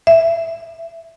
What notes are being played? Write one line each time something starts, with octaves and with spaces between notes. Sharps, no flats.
E5